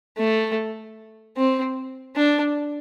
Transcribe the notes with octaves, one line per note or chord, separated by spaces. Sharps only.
A3
C4
D4